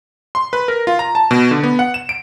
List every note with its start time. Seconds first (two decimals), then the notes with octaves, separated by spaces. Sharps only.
0.35 C6
0.53 B4
0.68 A#4
0.87 F4
0.99 A#5
1.15 A5
1.31 B2
1.51 D3
1.63 B3
1.79 F#5
1.94 E7
2.09 D7